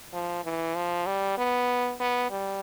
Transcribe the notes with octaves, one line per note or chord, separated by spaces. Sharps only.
F3
E3
F3
G3
B3
B3
G3